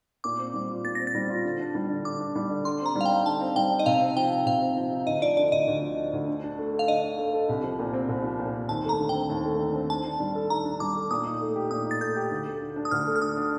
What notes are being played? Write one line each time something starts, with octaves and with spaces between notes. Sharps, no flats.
A#2 D6
C4
G3
F4
A#2 A6
C4 A#6
A6
G3
F4
D3
D4
G3
D3
D3 D6
D4
G3
D3
D3 C6
C4 A#5
G3
F5
G5
D#4
D3 A5
C4
G3 G5
D#4
D#5
C3 F5
C4
F3 G5
D#4
C3 F5
C4
F3
D#4
D2 D#5
F3 D5
D3 D5
D2 D#5
D2
F3
D3
D2
D3
D4
A3
A4
F5
D3 D#5
D4
A3
A4
C2
F3
A#2
C4
C2
F3
A#2
C4
D#2 A5
A3 A#5
D3
G5
C4
D#2
A3
D3
C4
D#3 A5
D4
G3
A4
D#3 A#5
D4
G3 D6
A4
A#2 D#6
D#4
A3
G4
A#2 D#6
D#4
A6
A3 G6
G4
D2
A3
D3
D4
D#6
D2 F6
A3
F6
D3 D#6
D4